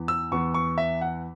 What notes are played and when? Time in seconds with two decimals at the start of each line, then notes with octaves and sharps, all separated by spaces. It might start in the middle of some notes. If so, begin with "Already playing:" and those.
Already playing: E2 E3 B3
0.08 E6
0.32 E2 E3 B3 C#6
0.54 C#6
0.78 E5
1.01 F#5